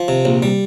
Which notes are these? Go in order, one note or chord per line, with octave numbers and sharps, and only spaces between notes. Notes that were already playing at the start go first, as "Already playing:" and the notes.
Already playing: F3
C3
A#1
G3